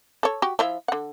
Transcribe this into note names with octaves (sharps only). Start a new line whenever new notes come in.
A4 C#5
F#4 G4
F3 E4 E5
D3 F#5